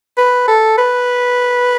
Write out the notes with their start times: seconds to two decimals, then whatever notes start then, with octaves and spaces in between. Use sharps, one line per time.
0.18 B4
0.48 A4
0.78 B4